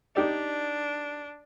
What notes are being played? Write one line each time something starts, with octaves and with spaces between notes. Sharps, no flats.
D4 D#4 G4 D5